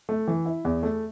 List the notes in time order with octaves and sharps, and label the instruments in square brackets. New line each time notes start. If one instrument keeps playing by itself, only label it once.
[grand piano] A3
E3
E4
E2
A3